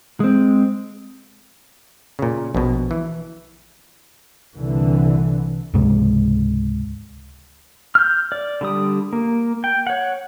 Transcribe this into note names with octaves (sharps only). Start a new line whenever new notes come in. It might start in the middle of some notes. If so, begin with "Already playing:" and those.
G#3 C4
A#2 C#3
A#1 B2
E3
C2 D3 E3
C#2 G#2 C3 G#3
F6 G6
D5
D3 G3 D#6
A#3
G5
C#5 F#5